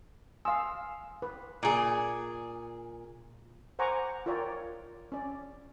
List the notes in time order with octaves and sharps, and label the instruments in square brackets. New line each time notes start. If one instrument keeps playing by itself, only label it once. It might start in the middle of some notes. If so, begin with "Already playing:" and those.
[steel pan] F5 E6 [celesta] G#5 C6 D#6
[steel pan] B4
[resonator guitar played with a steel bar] A#2 G#4
[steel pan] C5 F#5 G#5 A#5 C#6 D6
F4 A#4 C#5 D5 G5
C#4 D5